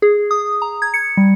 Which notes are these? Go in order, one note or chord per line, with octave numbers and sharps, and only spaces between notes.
G#4
D#6
A#5
G#6
C#7
G3